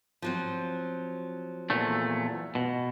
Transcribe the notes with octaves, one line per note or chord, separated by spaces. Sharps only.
F3 F#3 C4
E2 A#2 A3
B2